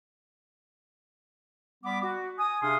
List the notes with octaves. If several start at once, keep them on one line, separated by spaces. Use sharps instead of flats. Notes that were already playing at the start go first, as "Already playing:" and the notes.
G3 B3 B5 D6
F#4
G#5 D#6
C3 D4 G#4 F5 C6 D#6